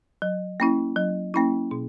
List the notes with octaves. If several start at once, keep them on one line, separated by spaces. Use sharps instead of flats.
F#3
A#3 C#4 E4
F#3
A#3 C#4 E4
B2